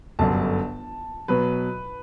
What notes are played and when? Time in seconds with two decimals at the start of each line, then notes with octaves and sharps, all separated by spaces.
0.19 G1 F#2 D3 A5
1.28 B2 F#3 B4